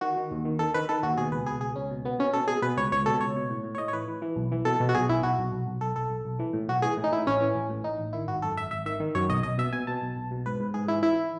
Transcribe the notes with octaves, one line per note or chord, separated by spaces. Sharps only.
D#3 F#4
D#3
D#2
D#3
D#3 A4
D#3 B4
D#3 A4
D#2 F#4
B2 G#4
C#2 B4
B2 G#4
C#2 G#4
C#2 C#4
B2
B2 B3
B2 C#4
B2 A4
B2 G#4
B2 B4
C#2 C#5
C#2 C#5
B2 A4
C#2 C#5
B2
A2
A2
C#5
A2 D#5
C#5
E3 B4
E3
E3
B1
E3
B2 A4
B2
F#4
B1 G#4
B1 E4
B1 F#4
B1
B1
B1
B1 A4
B1 A4
B1
B1
E3
A2
B1 F#4
E3 G#4
A2
D#4
A2 E4
A1 C#4
E3
A1
A2
A1 D#4
A1
D#3 E4
G#1 F#4
F#2 A4
G#1 E5
G#1 E5
D#3 E5
D#3
F#2 C#5
B1 D#5
B1 D#5
B2 E5
B2 G#5
B2 A5
B1
B1
B2
G#2 B4
G#2
G#2 G#4
E3 E4
E3 E4